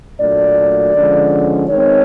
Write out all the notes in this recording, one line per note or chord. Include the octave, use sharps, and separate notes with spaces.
A#2 F#3 A3 D4 D5
D3 F3 G#3 C#4
D#3 G#3 C4 C#5